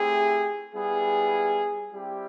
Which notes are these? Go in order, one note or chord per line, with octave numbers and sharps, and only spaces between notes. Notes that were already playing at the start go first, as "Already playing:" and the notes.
Already playing: A3 C4 E4 G4 G#4
G3 B3 E4 G#4
G3 C4 E4 G4